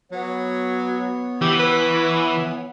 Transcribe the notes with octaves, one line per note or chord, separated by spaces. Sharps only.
F#3 B3 C#5
E3 G4
B4